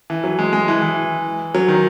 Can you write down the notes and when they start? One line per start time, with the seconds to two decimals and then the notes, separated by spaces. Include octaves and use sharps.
0.10 E3
0.24 F#3
0.39 G#3
0.53 G#3
0.68 E3
0.82 E3
1.55 F#3
1.68 D#3